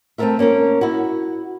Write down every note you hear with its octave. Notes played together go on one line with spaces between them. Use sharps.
A3 C4 E4 A4 A#4 E5
A#3 C#4 F4 A#4
E4 F#4